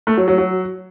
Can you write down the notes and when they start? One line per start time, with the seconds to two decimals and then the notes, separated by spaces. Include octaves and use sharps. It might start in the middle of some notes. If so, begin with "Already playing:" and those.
0.07 A3
0.17 F#3
0.28 F#3
0.38 F#3